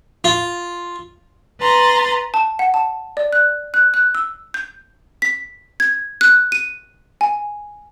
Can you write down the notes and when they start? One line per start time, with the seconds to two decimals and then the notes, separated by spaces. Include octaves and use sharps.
0.24 F4
1.60 B4 A#5 C6 A6
2.34 A5
2.59 F#5
2.74 A5
3.17 D5
3.33 F#6
3.74 F#6
3.94 F#6
4.15 E6
4.54 G6
5.22 B6
5.80 G#6
6.21 F#6
6.52 D#7
7.21 G#5